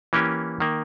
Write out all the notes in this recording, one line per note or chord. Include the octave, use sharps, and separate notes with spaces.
E3 A#3 C#4 G4
D#3 A#3